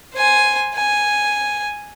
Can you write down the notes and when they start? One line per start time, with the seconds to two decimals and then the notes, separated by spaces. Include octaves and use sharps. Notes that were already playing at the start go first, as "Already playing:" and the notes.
0.14 C5 G#5
0.75 G#5